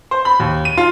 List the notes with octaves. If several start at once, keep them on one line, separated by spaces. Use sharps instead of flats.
C5
B5
D#2
D#7
F4